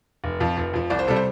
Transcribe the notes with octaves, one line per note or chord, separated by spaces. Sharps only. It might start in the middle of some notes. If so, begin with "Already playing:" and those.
F1
F2 F3
F1
F2 F3
C2 D5
C5
C3 G3 A4
C5